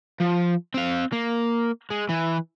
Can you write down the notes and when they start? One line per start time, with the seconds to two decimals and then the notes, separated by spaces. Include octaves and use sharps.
0.20 F3
0.74 C4 F5
1.12 A#3
1.91 G#3
2.09 E3